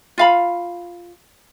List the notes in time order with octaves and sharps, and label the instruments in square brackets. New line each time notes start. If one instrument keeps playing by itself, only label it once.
[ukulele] F4 F5 B5